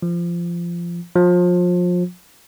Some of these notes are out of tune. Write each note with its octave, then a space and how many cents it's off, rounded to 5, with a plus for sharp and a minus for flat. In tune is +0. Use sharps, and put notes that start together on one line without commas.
F3 -20
F3 +30